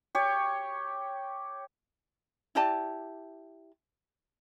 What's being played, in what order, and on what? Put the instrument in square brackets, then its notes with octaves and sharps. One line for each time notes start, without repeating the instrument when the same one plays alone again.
[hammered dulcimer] G4 C#5
[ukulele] E4 G4 D5 A5